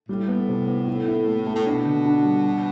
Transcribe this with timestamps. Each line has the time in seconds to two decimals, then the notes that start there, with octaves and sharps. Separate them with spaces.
0.09 A2 G3
0.28 B3
0.49 C3
0.68 B3
0.87 E4
1.08 E4
1.27 A3
1.47 A3
1.56 A2
1.66 B2 D4
1.86 D3
2.05 D4
2.25 G3
2.45 F#4